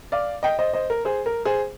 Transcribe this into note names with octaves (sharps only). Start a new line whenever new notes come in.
D5 F5
D#5 G5
C5 D#5
C5 D#5
A#4
G#4 C5
A#4
G#4 C5